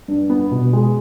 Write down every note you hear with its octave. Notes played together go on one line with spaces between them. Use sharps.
G2
B3
B2
G#3